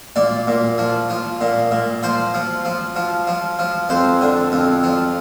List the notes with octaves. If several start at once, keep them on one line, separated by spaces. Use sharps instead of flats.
A#2 D5
A#2
F3
F3
A#2
A#2
F3 C5
F3
F3
F3
F3
F3
F2 C5
D3
F2
F3